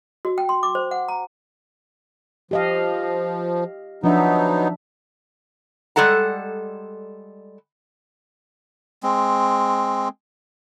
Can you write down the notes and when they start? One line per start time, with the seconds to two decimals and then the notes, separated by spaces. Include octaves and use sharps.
0.25 F#4
0.38 G5
0.49 C6
0.63 D6
0.75 C5
0.91 F#5
1.08 A#5
2.51 F3 G4 D#5 F5
4.03 F3 F#3 B3 D4 D#4 E5
5.96 G3 G#3 A4 F#5 A#5
9.03 G#3 C4